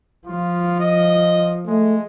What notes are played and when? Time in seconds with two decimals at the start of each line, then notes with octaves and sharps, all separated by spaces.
0.27 F3 F4
0.80 D#5
1.67 G#3 A3